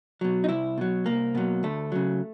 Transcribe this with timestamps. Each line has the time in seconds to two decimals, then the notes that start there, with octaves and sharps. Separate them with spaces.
0.21 B2 F#3
0.44 D#4
0.49 C2 E4
0.78 B2 F#3
1.06 C2 A#3
1.35 B2 F#3
1.63 D2 A3
1.92 C#3 F#3